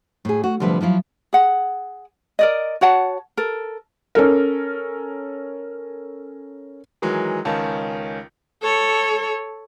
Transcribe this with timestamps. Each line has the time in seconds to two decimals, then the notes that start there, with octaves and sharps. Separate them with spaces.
0.25 A2 G#4
0.44 F#4
0.60 D2 C3 F3 G3 B4 E5
0.81 F3 F#3 E4 F4
1.33 G#4 F#5
2.39 A#4 D5 D#5
2.81 F#4 C#5 F#5 A5
3.37 A4 A#4
4.15 C#4 A4 A#4
7.02 D#3 E3 F#3 G#3
7.45 C#2 D#3 C#4 A5
8.62 A4 C#5